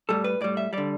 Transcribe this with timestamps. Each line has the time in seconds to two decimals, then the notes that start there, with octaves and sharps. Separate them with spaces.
0.09 A2 G3 A4
0.24 B4
0.41 A2 G3 D5
0.57 E5
0.73 D3 G3 D5